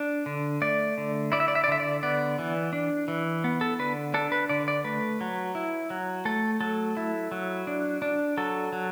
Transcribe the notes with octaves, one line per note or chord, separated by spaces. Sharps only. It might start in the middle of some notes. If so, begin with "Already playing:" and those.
Already playing: D4
D3
A3 D5
D3
E4 D5
E5
D5
E5
D5
D3 E5
D5
B3 D5
E3
D4
E3
B3
A4
D3 B4
D4 A4
B4
D3 D5
D5
A3 B4
F#3
E4
F#3
A3 A4
F#3 A4
E4
F#3
D4
D4
F#3 A4
F#3